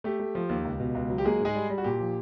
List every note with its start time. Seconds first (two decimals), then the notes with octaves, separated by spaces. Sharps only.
0.04 A3 G4
0.19 A3
0.35 F3
0.49 D#2
0.65 C#2
0.80 B2
0.95 C#2
1.10 F#3
1.18 G4
1.24 G#3 A#3 G#4
1.41 G#2 G#3 G#4
1.55 G3
1.70 G3
1.78 F#4
1.84 A#2 G4
2.00 F3